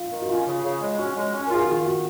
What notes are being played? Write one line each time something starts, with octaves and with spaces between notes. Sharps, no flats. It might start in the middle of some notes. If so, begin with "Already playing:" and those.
Already playing: F4
D#3
F#4
C#4 F4
C#3
C#3
G#3
C#4 F#4
G#3
C#4
A#4
F4 G#4
F#4
D#3 F4
F#4